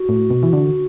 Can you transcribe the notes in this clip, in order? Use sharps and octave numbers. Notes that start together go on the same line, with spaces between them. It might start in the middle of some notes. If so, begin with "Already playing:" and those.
Already playing: F#4
A2
B2
E3
D3